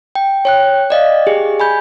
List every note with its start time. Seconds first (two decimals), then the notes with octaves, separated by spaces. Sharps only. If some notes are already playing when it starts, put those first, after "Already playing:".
0.15 G5
0.45 C#5 G5 F#6
0.90 D5 D#5 F5
1.27 G4 G#4
1.60 G#5 B5 G6